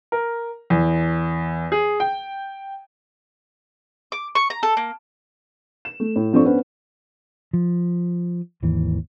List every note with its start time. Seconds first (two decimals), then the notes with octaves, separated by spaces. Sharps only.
0.12 A#4
0.70 E2
1.72 G#4
2.00 G5
4.12 D6
4.35 C#6
4.50 A#5
4.63 A4
4.77 A#3
5.85 E7
6.00 A3
6.16 A2
6.33 G2 F3 C4 A4 D5 C#6
6.45 B3 C#4 D4 B4 C5
7.53 F3
8.62 G#1 D#2 E3